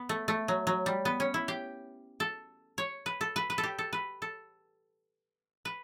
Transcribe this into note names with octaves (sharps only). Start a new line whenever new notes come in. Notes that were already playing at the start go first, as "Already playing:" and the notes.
Already playing: B3
A3
A3
F#3
F#3
G3
B3
C#4
E4
G4
A4
C#5
B4
A4
B4
B4
A4
G4
A4
B4
A4
B4